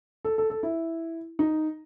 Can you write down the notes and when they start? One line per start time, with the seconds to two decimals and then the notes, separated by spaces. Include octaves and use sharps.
0.25 A4
0.38 A4
0.50 A4
0.63 E4
1.39 D#4